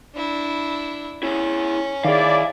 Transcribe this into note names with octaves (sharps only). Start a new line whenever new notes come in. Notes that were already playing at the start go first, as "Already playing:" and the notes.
D4 E4
C#4 E4 G#4
D#3 E4 G#4 D5 D#5 F5